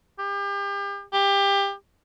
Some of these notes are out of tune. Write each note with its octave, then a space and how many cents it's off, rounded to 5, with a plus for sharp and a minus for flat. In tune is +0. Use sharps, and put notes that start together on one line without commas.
G4 +35
G4 +20